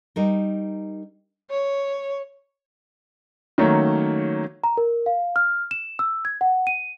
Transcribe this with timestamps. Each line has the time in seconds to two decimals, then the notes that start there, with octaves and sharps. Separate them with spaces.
0.16 G3 D#4 A#4
1.50 C#5
3.58 D#3 F#3 A3 A#3 C#4 C#5
4.64 A#5
4.77 A#4
5.06 F5
5.36 F6
5.71 E7
5.99 E6
6.25 G#6
6.41 F#5
6.67 D#7